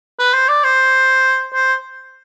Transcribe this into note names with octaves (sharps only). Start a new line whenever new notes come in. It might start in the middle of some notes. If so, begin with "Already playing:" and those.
B4
C5
D5
C5
C5